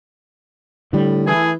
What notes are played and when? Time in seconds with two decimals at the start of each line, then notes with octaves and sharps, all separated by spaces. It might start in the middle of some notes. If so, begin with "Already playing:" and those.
0.93 A2 D3 G3
1.27 E3 A3 E4 G#4